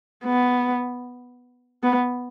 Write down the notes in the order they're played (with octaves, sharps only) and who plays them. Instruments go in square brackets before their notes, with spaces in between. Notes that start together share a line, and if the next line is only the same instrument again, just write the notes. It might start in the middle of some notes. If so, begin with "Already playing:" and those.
[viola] B3
B3